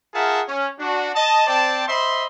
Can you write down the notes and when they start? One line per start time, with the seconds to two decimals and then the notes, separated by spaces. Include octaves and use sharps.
0.14 F4 G#4 A#4 E5 F#5 A5
0.49 C#4
0.79 D4 F#4
1.15 D#5 A5
1.47 C4 C5 D5 G5 A5
1.88 C5 D#5 E5 B5 C6